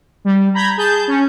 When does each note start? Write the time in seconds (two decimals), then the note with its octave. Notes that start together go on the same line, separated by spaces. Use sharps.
0.25 G3
0.54 A#5 B5 G6 G#6
0.77 G#4 A5 G6
1.08 C#4